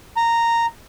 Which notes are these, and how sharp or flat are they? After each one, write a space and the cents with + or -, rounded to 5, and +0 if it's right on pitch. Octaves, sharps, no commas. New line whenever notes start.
A#5 -10